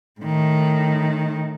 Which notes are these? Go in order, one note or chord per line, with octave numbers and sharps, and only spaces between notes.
A2 D#3